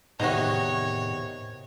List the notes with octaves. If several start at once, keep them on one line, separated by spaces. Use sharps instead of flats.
E2 A2 C3 D#3 D#4 F#4 C#5